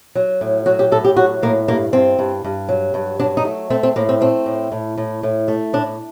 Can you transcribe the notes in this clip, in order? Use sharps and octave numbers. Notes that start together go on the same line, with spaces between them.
F#3
A2
F#3 F#4
G4
A2 A4
G4
F#3 F#4
A2 A#3
G2 A#3
G2 C4
G2
G2
F#3
G2
F#3 D4
D#4
A3
A3 C4
C4
A2 A#3
C4
A3 C4
A2
A2
A2
A2
A3
A2 D4